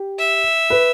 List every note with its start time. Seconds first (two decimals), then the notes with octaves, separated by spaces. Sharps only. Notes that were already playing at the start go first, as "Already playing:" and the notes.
Already playing: G4
0.19 E5
0.70 B4